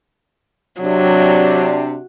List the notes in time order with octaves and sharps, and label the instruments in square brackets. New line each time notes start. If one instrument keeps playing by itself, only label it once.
[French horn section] C3 D4 [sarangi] F#3